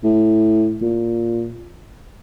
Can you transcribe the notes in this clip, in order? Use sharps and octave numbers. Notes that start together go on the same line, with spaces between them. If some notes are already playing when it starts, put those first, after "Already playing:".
A2
A#2